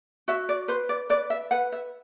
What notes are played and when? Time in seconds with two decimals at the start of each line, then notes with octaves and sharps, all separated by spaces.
0.28 F#4 E5
0.49 D5
0.68 B4 C5
0.89 D5
1.10 B4 D5
1.30 E5
1.51 B4 F#5
1.72 E5